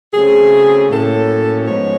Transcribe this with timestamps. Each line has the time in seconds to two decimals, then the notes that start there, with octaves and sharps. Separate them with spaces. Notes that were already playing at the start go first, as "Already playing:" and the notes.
0.13 C#3 F#3 A3 C4 G#4
0.89 A2 F#3 A#3 C#4 A4
1.66 G#2 F3 G#3 B3 C#5